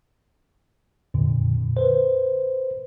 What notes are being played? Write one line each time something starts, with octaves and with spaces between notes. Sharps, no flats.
F2 A#2 D3
B4 C5